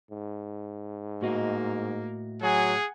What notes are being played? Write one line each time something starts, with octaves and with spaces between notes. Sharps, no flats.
G#2
A2 A#3 F#4 D#5
F#3 G#4 F#5 G#5